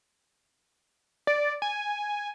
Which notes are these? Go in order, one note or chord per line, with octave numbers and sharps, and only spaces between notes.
D5
G#5